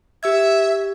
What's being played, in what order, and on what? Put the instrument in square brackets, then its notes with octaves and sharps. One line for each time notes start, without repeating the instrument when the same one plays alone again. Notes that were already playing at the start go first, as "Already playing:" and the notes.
[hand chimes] G4 E6 G#6 [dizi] E5